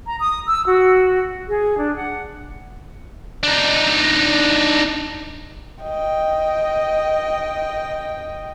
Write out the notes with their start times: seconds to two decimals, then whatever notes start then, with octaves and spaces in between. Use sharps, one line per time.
0.06 A#5
0.19 D#6
0.47 E6
0.65 F#4
1.47 G#4
1.78 D4
1.95 F#5
3.43 D4 D#4
5.83 D#5 G5